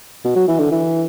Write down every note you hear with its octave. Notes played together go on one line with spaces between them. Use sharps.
B2
F#3
E3
D3
E3